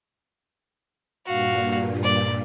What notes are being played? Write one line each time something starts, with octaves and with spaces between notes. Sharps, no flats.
G2 A#2 F#4 F5
D5